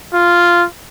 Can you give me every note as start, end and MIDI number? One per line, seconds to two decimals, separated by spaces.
0.13 0.64 65